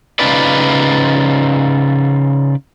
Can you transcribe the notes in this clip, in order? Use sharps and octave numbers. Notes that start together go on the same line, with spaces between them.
C#3 D#4 F4 B4 D5